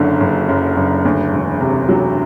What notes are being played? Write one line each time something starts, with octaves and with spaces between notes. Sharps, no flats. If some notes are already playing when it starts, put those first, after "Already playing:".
Already playing: F#1 F#2 D3
F#1
F#2
F#1
D2
E1
C3
F#3